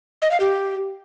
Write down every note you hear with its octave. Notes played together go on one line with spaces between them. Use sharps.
D#5
F5
G4